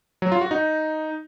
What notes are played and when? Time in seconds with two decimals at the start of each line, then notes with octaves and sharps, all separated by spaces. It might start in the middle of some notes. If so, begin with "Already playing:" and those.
0.22 F#3
0.32 F4
0.41 F#4
0.51 D#4